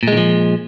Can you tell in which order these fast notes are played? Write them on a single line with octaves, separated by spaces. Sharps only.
A#2 G#3 D#3 F3